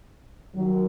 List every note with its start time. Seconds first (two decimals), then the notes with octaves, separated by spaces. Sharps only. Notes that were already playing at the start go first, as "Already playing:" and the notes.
0.55 D#3 F#3